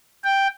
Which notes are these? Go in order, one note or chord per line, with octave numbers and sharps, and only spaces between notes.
G5